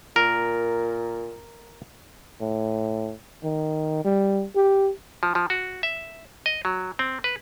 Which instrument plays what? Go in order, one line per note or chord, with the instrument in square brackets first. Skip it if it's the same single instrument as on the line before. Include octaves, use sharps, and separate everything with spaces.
[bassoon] A#2 [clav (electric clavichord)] A#4
[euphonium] A2
D#3
G3
G4
[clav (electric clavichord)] F3
F3
F#4
E5
D#5
F#3
C4
B4